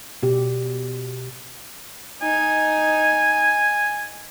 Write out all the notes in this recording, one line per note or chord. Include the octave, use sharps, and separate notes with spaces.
B2 G4
D#4 D#5 G#5